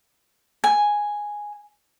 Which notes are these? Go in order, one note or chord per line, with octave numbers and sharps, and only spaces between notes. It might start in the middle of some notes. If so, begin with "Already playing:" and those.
G#5